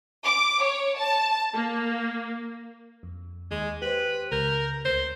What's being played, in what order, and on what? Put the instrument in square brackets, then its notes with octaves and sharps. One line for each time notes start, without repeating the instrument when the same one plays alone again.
[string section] D6
C#5
A5
A#3
[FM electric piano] F2
[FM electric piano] D#2 [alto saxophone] G#3
[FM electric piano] G4 C5 [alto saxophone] B4
[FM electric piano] C#2 G6 [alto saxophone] A#4
[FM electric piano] D2 [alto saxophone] C5